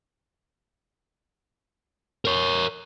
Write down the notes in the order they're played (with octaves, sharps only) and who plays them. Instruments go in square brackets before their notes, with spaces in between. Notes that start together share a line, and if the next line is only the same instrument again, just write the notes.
[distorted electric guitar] A#4 C#5